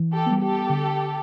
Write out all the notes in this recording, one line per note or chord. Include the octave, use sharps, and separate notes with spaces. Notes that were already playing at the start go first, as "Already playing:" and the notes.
Already playing: E3
G4 A4
G3 B3
G4 A4
D3